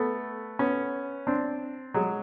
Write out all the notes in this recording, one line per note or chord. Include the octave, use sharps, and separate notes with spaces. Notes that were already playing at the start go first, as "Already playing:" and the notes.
Already playing: A3 B3
B3 C#4
C4 D4
F#3 G#3